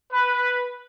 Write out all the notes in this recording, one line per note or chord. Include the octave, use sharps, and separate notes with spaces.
B4